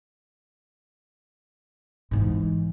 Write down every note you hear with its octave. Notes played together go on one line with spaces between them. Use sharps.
G#2 E3